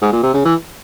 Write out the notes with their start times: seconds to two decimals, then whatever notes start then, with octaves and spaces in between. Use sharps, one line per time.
0.01 G#2
0.12 A#2
0.23 C3
0.34 C#3
0.45 E3